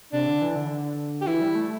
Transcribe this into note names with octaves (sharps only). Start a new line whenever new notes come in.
C3 D4
D3
E3
D3
D3
G4
E3 E4
G3
A3